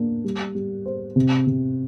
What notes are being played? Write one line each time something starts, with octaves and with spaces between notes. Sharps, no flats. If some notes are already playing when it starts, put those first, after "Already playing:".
Already playing: A#3 D4
G3
G3
C5
C3
C3